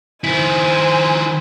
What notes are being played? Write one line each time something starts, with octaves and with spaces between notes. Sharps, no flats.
D#3 E4 C5 G#5